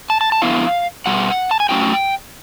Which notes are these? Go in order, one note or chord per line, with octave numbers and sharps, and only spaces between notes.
A5
A5
A5
F2 D3 G3 B3 E4 F5
B2 G3 F#5
A5
G#5
A2 F#3 A3 C#4 G5